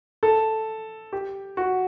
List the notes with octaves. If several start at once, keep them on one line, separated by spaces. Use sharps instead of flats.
A4
G4
F#4